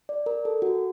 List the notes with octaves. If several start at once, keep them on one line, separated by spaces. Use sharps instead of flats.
D5
A#4
A4
F#4